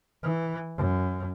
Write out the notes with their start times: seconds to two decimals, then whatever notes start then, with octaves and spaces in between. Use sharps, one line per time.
0.23 E3
0.77 F#2